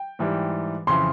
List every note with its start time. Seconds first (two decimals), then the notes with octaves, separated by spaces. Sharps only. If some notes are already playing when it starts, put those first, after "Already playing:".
Already playing: G5
0.19 G#2 E3 G3
0.87 F2 C#3 E3 C6